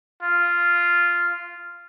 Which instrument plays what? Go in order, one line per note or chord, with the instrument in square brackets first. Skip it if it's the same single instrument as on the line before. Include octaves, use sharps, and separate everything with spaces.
[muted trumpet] F4